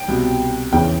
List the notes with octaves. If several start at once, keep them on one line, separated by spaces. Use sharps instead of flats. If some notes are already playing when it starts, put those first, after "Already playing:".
Already playing: G5
C2 B2
E2 C#3 E3 G5